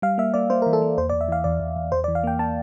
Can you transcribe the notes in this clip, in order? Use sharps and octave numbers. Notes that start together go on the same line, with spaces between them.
G3 F5
A#3 E5
A#3 D5
A#3 C5
A#4
E3
A4
A#3
E2 C5
D5
E2
E5
E3 F5
E2 D5
E2
E2
E2 C5
D5
E3
F5
A#3 G5
A#3 A5